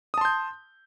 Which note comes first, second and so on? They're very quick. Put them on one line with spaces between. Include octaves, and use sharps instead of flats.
D#6 A5 C6 G6